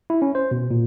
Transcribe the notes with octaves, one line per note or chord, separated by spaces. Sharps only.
E4
C#4
C5
B2
A#2